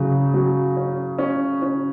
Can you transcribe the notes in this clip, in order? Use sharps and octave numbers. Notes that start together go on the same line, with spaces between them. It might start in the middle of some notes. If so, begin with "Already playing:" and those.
Already playing: C#3 F#3
F#3
C#4
C#4
C#4